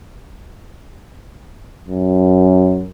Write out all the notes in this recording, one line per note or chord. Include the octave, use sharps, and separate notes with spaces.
F#2